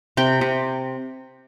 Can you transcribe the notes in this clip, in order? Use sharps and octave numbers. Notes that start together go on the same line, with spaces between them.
C3 G5
C3